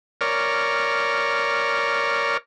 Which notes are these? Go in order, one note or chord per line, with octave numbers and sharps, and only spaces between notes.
A#4 C#5 D5 F6